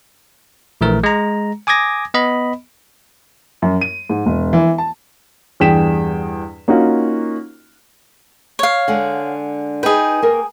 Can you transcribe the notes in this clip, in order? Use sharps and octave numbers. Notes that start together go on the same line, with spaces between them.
A#1 E3 A3 A#4
G#3 A#5
G#5 D6 D#6 G#6 A#6
B3 D#5 B5
F#2
D#7
G#2
E1
E3
A5
E2 G2 G#4 G5 B6 E7
A#3 C#4 D#4 F4 F#4
C#5 F5
D3 G#3 F#5
D#4 G#4 B4 G5
A#3 A#4